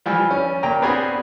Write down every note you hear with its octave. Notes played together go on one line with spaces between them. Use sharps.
E3 F3 G3
C#4
A#2 G5 A#5
B3 C4 D4 F#4 G#4 G#5